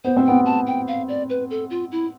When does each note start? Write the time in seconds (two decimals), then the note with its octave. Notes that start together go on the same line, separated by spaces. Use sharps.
0.04 B3 C5
0.17 C4
0.25 B3 G5
0.46 A5
0.67 G5
0.87 F5
1.08 D5
1.30 B4
1.50 A4
1.70 F4
1.92 E4